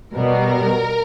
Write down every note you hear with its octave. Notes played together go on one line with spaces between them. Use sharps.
B2 G3 B3 A#4